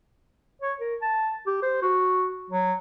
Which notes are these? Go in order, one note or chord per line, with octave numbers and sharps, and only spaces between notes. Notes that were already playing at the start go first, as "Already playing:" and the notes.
C#5
A#4
A5
G4
C5
F#4
F#3